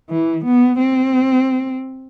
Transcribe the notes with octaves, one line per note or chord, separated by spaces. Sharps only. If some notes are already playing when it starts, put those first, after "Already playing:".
E3
B3
C4